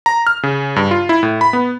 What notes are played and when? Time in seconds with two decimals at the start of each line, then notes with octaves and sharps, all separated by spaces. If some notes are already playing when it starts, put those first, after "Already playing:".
0.06 A#5
0.27 F6
0.43 C#3
0.76 G2
0.91 F4
1.09 E4
1.23 A2
1.41 B5
1.53 B3